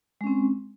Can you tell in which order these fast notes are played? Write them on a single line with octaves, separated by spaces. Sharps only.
G#3 C#4 C4